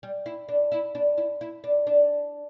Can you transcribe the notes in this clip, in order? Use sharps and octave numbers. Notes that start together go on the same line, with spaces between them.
G3
E4
D4
E4
D4
E4
E4
D4
D4